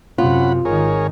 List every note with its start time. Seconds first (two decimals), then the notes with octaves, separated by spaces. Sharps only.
0.18 F#2 C3 C#4 F4 F#5 B5
0.65 G#1 D#3 G#4 A#4 C#5